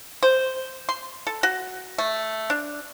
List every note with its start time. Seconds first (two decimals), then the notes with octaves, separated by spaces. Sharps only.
0.23 C5
0.89 C6
1.27 A4
1.43 F#4
1.98 A3
2.50 D4